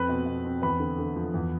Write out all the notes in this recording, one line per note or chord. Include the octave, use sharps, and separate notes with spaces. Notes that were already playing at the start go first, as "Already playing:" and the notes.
Already playing: F2 C4 B4 B5
B2
B2
C4
E2 B4 B5
D3
D3
F3
E2